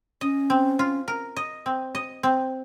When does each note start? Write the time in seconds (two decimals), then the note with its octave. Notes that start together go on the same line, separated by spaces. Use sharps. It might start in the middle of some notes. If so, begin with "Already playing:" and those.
0.21 C#4 D#5
0.50 C4
0.79 F4
1.08 A#4
1.37 D#5
1.66 C4
1.95 D#5
2.23 C4